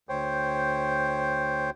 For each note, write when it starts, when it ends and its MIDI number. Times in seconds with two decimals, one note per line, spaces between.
0.09 1.70 38
0.09 1.70 72
0.09 1.70 73
0.09 1.70 79